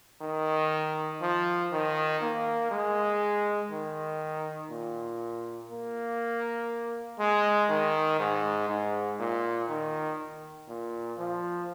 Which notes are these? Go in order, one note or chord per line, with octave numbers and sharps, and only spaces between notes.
D#3
F3
D#3
A#3
G#3
D#3
A#2
A#3
G#3
D#3
G#2
G#2
A#2
D#3
A#2
F3